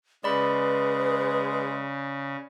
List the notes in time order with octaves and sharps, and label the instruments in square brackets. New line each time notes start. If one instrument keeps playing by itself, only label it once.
[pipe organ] C#3 [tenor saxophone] G#3 [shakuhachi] B4 [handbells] D5 B5